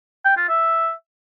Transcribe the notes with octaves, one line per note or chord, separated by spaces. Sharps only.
G5
F4
E5